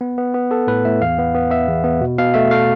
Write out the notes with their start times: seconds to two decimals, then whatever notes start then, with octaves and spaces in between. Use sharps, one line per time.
0.01 B3
0.18 B3
0.35 B3
0.51 B3 A4
0.67 A2 B4
0.85 A2 E5
1.01 E2 F5
1.18 B3
1.35 B3
1.51 B3 E5
1.68 E2
1.84 B3
2.01 B2
2.18 B2 F5
2.34 A3 E5
2.51 A3 F5